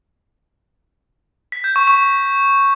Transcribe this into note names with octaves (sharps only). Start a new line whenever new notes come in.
B6
G6
C#6
C#6